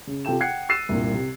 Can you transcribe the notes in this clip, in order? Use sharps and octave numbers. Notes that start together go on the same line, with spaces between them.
C#3
C3 F4 A4 G5 E7
F#5 G5 F#6 G#6 C7 C#7
E6 F#6 A6 C7 D#7 E7
C2 G2 A#2
C3